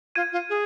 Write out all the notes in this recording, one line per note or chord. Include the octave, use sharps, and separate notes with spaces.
F4 G#6 D#7
F4
G#4